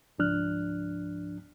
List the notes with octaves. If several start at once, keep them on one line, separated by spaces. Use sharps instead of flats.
C#2 G#2 F3 D4 F6 F#6